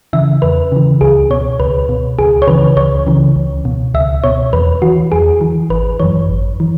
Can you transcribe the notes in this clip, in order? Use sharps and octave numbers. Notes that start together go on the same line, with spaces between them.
C#3 E3 E5
E2 B4
C#3 E3
C#2 G#4
B2 C#5
C#2 B4
B2
C#2 G#4
C#5
C#3 E3 B4
C#2 C#5
C#3 E3
C#2
B2
C#2 E5
B2 C#5
E2 B4
E3 F#4
E2 G#4
E3
G#1 B4
F#2 E3 C#5
G#1
E3